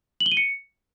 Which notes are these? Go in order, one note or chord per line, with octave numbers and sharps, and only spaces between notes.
F#7
G7
D#7
C#7